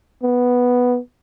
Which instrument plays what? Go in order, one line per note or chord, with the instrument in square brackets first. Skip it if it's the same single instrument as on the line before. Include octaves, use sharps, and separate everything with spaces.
[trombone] B3